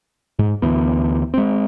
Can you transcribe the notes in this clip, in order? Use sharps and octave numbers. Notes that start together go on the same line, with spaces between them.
G#2
D2 E3 B3
G#3 C4